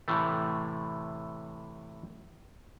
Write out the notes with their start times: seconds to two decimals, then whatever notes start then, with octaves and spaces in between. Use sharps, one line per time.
0.08 A2 C3 E3 A3